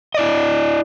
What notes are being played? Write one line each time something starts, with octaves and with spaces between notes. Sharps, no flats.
E4 D5 D#5